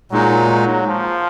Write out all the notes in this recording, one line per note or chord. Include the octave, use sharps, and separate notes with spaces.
A#2 F#3 G#3 D#4
F#3
F3